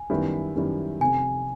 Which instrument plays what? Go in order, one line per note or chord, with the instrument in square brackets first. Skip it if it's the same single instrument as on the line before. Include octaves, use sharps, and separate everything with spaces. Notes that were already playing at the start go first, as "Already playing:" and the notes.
Already playing: [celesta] G#5
[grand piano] F#2 D#3 G3 B3 E4
F#2 D#3 G3 B3 E4
[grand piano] F1 F2 C3 [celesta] G#5